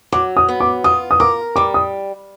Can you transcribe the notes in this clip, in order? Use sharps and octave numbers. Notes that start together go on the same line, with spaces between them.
F#3 D6
D#6
B3
D6
F4 D#6
D#6
A#4 D6
G3 D6
D#6